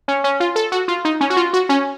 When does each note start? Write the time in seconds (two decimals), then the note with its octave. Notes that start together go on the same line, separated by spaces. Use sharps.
0.08 C#4
0.24 C#4
0.40 F4
0.56 A4
0.72 F#4
0.88 F4
1.05 D#4
1.21 C#4
1.30 F#4
1.37 F4
1.53 F#4
1.69 C#4